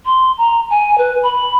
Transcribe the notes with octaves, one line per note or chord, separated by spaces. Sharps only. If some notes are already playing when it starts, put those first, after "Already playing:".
C6
A#5
G#5
B4
B5